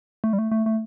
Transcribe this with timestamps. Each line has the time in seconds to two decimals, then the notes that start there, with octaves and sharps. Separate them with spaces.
0.24 A3
0.33 G3
0.39 A3
0.52 A3
0.66 A3